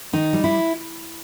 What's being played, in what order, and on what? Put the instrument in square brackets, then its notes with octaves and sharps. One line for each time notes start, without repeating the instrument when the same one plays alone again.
[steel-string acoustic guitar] D#3 D#4
G3
E4